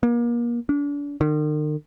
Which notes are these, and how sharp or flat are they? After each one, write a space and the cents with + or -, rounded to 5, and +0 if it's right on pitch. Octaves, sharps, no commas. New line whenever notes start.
A#3 +35
D4 -35
D#3 -45